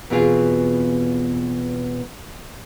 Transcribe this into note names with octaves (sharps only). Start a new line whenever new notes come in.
E2 B2 C4 F4 G#4